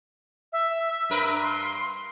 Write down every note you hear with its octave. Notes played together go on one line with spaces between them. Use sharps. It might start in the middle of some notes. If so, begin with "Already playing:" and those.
E5
G2 A#4 B4
C6